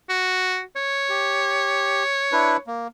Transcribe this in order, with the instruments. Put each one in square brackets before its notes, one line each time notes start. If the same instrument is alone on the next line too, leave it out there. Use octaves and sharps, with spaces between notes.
[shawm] F#4
C#5
[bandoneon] G4
D4 E4 B4
A#3